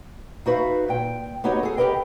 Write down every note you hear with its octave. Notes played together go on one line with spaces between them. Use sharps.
D#4 F#4 B4 D5 E5 F5
A#2 G5
B3 D#4 F#4 G4 C#5 D#5
G#4 A4
G4 G#4 A#4 B4 D#5 G5